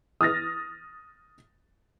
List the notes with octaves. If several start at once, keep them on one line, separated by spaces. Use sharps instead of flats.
D#6 F6 A6 A#6